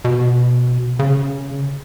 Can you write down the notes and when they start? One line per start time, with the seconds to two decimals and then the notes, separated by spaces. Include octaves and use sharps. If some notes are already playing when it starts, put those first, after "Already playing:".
0.05 B2
0.99 C#3